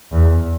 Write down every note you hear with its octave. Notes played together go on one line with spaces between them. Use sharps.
E2